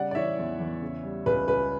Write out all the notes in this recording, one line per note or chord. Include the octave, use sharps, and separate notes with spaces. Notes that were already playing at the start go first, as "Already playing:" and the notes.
Already playing: C#3 G3 D5 F#5
D5
E3 C#5 E5
E2
E2
C#3
G3
C#2 B4
C#2 B4